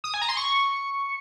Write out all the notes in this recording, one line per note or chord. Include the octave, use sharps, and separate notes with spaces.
D#6
G#5
A#5
C6
C#6